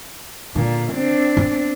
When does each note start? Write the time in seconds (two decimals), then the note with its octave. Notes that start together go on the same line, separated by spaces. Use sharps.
0.56 A#2 D3
0.93 C4 D4
1.37 B3